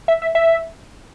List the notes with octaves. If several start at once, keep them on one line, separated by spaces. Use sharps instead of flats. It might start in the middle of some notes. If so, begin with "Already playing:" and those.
E5
E5
E5